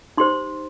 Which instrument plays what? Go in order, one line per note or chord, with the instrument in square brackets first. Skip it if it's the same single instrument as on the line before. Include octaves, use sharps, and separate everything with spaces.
[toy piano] D#4 G4 C5 C6